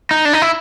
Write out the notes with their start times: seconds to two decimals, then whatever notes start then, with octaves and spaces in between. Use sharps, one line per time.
0.11 D#4
0.25 D4
0.33 D#4
0.42 E4